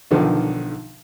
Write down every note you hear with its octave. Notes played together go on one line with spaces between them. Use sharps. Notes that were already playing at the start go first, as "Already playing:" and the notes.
B1 D3 D#3 F3